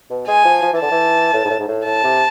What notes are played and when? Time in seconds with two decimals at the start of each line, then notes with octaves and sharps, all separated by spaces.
0.10 B2
0.28 G#3 G#5
0.45 F3
0.63 F3
0.73 E3
0.80 D3 A5
0.91 E3
1.33 A2
1.45 G#2
1.50 A2
1.60 G#2
1.68 A2
1.86 A2 A5
2.04 C3